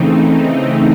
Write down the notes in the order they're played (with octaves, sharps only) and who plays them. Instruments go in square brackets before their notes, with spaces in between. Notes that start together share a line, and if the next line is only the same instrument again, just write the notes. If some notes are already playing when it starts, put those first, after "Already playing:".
Already playing: [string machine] C#3 E3 A3 C4 D#4